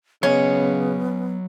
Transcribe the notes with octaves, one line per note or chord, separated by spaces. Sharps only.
C#3 F#3 B3 C#4 D#5